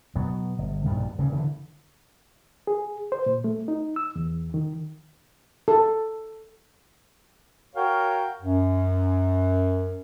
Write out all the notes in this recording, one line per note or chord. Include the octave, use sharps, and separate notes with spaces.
B2 F#3 B3
G1
A#1 G2 B2 D#3
G2 C#3
D3 E3
G#4
C5
A#2
A3
D#4
E6
E2
D#3
A4
F#4 A#4 C#5 F5 G5
F#2